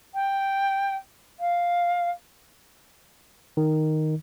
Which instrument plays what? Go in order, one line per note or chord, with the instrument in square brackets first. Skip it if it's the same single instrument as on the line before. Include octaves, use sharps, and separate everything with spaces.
[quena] G5
F5
[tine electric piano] D#3